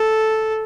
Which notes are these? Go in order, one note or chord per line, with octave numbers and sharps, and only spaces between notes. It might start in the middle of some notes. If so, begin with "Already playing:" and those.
Already playing: A4